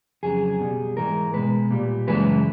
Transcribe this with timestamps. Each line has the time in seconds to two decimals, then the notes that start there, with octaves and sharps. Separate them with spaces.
0.23 F2 C#3 F#3 G#4
0.60 B2 G3
0.97 G#2 E3 G#3 A#4
1.33 B2 G#3 B4
1.70 A#2 G3
2.07 F#2 C#3 E3 G#3 B4